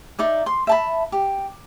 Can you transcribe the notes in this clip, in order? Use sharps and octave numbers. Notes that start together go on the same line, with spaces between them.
D#4 D5 E5
C6
E5 A5 B5
G4